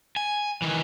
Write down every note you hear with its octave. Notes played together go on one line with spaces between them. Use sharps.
G#5
D#3 E3